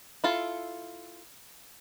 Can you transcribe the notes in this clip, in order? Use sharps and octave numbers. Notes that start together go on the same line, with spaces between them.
E4 F4 A4